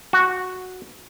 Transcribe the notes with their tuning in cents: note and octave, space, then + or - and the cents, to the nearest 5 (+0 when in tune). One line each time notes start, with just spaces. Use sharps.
F#4 -5